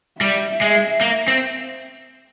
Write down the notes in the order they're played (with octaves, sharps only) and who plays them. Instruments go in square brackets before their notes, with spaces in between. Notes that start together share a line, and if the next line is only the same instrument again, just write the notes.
[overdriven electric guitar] G3 [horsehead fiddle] E5
[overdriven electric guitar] G#3
A#3
C4